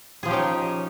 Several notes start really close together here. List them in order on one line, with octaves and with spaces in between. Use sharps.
G#4 F3 G4 C#4 D#4